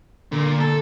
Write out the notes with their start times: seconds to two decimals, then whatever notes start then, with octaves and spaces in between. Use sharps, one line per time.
0.32 A#2 D3
0.60 A4